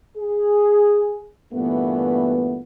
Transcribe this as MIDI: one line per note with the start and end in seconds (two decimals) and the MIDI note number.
0.18 1.29 68
1.54 2.60 43
1.54 2.60 46
1.54 2.60 52
1.54 2.60 57
1.54 2.60 59